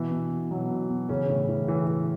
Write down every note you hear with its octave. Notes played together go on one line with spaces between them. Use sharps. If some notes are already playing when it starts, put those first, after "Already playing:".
Already playing: B2 E3
B2
B2
B2 F#3
B2
B2
C#3 E3 C#4
A2
E3
E3
E3